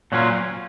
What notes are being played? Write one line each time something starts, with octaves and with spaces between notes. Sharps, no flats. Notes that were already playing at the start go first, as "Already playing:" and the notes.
A#2 F#3 C#4 F4